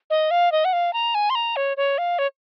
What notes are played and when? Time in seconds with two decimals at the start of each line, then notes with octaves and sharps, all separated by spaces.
0.10 D#5
0.31 F5
0.52 D#5
0.65 F#5
0.73 F5
0.93 A#5
1.14 G#5
1.30 C6
1.35 A#5
1.56 C#5
1.77 C#5
1.98 F5
2.19 C#5